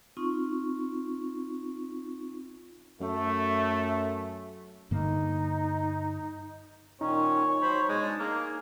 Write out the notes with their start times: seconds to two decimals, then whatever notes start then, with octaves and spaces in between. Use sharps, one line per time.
0.17 C4 D#4 F4 C#6
3.00 F#2 A3
4.91 G2 D3 A#3 D#4
7.01 A#2 D#3 C#4 D#4 C#5
7.62 F#3 C5 B5
7.89 B2 G#3
8.02 D4 C#5 A5
8.20 A#3 G#4